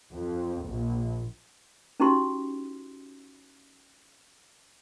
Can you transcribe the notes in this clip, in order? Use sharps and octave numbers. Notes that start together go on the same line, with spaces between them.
F2
A#1
C#4 D#4 E4 F#4 G4 C6